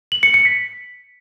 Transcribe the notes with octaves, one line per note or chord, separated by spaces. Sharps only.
F#7
C#7
C#7
B6